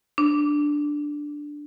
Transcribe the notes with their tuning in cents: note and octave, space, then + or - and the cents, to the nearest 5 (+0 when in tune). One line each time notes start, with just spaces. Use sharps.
D4 +0